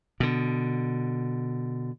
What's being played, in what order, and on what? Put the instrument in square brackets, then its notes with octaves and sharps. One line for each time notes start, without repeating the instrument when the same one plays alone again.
[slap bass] B2 D3